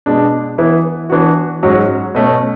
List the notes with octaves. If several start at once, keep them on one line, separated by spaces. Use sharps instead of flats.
B2 G#3 D4
E3 B3 E4
E3 B3 D4 F#4
G#2 F#3 C#4 F#4
B2 A3 C#4